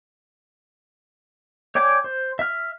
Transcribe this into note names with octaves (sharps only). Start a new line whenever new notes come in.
C#5 D5 G5 G#5 D6
C5
E5 F6